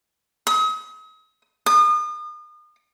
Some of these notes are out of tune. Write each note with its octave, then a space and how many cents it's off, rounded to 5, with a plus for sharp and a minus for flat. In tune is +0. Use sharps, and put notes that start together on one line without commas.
D#6 +40
D#6 -40